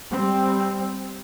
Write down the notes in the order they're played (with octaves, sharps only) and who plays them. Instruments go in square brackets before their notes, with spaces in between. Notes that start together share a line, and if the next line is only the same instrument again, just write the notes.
[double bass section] G3 C4